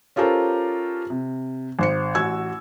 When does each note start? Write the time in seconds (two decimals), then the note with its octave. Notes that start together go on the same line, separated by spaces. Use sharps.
0.16 C#4 F4 G4 A4 A#4 C5
1.10 C3
1.79 G#1 C5 C#7
2.15 A1 F#4 E6 G#6